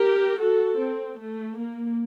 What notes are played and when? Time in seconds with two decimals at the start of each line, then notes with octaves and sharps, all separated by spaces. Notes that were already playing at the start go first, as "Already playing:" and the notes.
Already playing: G4 A#4
0.41 F#4 A4
0.79 C4
1.18 A3
1.57 A#3